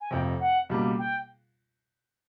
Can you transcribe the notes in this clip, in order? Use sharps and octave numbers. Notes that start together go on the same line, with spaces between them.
G#5
F1 F2 C3 G5
F#5
C#2 B2 G3 A#3
G5